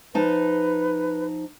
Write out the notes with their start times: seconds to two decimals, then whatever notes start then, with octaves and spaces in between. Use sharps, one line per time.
0.14 F3 D#4 B4 A5